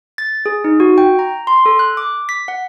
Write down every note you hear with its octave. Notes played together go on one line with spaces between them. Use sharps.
A6
G#4
D#4
F#4
G5
A#5
C6
A4
F#6
D6
B6
F#5